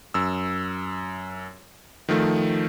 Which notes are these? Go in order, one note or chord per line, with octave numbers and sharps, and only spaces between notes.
F#2 E6
D#3 F3 A3